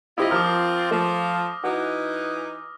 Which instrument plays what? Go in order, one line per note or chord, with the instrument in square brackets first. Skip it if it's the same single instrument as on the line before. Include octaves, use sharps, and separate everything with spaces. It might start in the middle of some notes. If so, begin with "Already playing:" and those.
[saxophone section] C4 F4 [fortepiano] E4 G4 D#5 [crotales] D#6 A#6
[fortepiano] F3 A#4 [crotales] D6 D#6 F6
[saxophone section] F3 [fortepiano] A3
[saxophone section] E3 D#4 [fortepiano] F#4